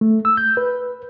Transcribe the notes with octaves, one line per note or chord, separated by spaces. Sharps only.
A3
E6
G6
B4